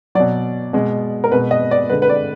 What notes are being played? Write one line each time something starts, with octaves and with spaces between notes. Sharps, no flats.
B2 F#3 D5
B2 G#3
A#4
B2 G#3 B4
D#5
D5
D3 G#3 B4
B4
D5